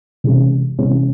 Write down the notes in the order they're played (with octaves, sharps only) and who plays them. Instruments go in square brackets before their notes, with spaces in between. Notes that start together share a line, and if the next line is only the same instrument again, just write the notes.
[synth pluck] C3 E3 G#3 C#4
C3 E3 G#3 C#4